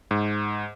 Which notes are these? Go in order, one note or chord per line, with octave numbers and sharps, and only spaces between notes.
G#2